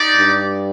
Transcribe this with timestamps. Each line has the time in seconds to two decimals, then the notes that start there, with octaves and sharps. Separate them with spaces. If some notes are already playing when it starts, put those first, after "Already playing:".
Already playing: D#4 G4 D5
0.17 G2